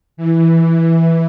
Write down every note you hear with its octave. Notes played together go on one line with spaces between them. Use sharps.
E3
E3